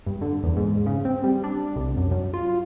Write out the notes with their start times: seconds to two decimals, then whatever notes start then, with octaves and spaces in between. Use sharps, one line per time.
0.06 G2
0.21 D3
0.43 E2
0.56 G#2
0.86 C#3
1.05 C4
1.24 G3
1.44 D4
1.76 C2
1.97 F#2
2.11 F#2
2.33 F4